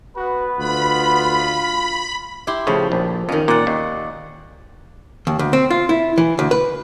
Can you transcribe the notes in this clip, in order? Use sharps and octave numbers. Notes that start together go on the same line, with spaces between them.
B3 F#4 B4
D2 F4 B5
E4 G4 C6
A2 C#3 F3
A#1
F2 D#3 C#4
A#2 D5 F#5
D#2
D#2
D2
C4
F4
E4
E3
D2
B4